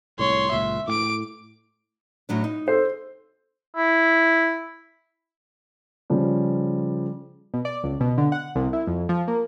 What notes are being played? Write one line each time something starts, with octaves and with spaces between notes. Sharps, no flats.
C2 A2 C#5 C6
F#1 C#2 A#2 E5
A2 D6 D7
A2 F#3 D4
D#4
A4 C5
E4
C#3 F3 G3
B2
D5
C#2
B2
D3
F#5
C2
E4
F2
F3
A#3